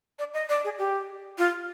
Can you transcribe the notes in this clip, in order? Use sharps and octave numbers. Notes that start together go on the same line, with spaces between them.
D5
D#5
D5
G#4
G4
F4